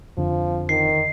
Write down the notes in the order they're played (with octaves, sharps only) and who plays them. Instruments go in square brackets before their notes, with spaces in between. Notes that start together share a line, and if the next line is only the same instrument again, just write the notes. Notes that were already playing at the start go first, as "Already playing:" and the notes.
[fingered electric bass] F2 D3 C4 [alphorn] F3
[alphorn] D#3 [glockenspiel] C7